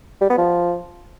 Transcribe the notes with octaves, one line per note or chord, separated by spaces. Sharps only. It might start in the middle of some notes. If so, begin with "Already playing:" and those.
G3
B3
F3